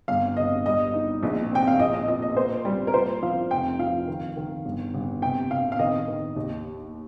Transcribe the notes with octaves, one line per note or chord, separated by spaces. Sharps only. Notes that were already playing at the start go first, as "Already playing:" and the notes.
G1 F5
G1 D#5
G3 D#5
D#4
A#1
C4 G5
F5
A#1 D#5
D#5
A#2 D#5
D#5
A#3 C5
G3
A#4
A#2 C5
F3 F5
F1 G5
F3 F5
D#3
D#3
G1
G1
C3 G5
C3 F5
F5
D#3 D#5
D#3
D#2